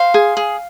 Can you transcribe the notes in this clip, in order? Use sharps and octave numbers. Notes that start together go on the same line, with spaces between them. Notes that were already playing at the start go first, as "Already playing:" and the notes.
Already playing: C5 F5
G#4
G#4